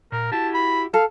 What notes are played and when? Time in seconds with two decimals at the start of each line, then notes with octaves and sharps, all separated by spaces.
0.12 A#2 A#4
0.32 E4 F#4 G4 A5
0.54 B5
0.94 A4 F5